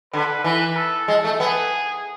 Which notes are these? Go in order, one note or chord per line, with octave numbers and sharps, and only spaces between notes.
D3 B4
E3 B4
A4
G#3
A3
B3 G#4